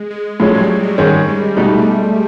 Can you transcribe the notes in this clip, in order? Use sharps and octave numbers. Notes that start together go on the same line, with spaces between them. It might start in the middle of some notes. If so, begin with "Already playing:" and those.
Already playing: G#3
G#3
A2 F3 F#3 G#3 C#4
G3
G#3
G#2 D#3 G3 G#3 C#4
G#3
B2 G3 A3 B3 D#4
G#3